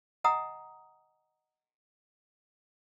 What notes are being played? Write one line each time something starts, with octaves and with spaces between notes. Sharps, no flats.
D#5 F#5 G#5 A#5 D#6